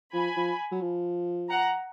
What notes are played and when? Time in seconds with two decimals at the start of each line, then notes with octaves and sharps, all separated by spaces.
0.13 F3 G#5 B5
0.36 F3
0.72 F#3
0.81 F3
1.49 F#5 A#5